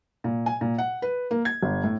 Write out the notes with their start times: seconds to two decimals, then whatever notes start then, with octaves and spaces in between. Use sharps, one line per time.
0.24 A#2
0.46 G#5
0.61 A#2
0.78 F#5
1.02 B4
1.31 A#3
1.45 G#6
1.63 G1
1.84 A2